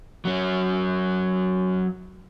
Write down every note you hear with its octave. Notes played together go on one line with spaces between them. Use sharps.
F#3 C#4